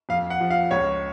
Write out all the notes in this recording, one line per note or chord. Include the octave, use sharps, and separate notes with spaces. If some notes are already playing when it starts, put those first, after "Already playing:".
F2 F5
F#5
F3
F5
C#2 C#5